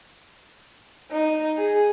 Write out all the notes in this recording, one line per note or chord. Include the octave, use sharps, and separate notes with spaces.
D#4
G#4